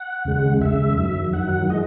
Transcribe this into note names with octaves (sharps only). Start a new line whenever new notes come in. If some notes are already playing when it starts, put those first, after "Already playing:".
Already playing: F#5
D#2 C#3 G#3
D#2 C#3 G#3 E5
F#2 D#3 F#3
F#2 D#3 F#3 F#5
E3 G#3 D#5